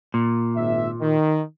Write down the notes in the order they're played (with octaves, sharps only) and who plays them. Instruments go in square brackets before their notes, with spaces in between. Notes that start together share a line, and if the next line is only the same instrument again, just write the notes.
[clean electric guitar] A#2
[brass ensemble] G#1 E5
D#3